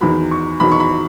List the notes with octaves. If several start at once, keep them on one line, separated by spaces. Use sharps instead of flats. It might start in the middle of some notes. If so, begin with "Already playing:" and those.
E2 D#3 F#3 B5
C#6
E2 D#3 F#3 B5
C#6
B5